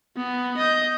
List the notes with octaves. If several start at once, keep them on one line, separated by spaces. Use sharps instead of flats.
B3
D#5 G6